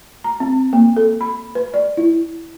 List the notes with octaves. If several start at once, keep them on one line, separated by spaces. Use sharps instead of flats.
A#5
C4
A#3
A4
B5
B4
D5
E4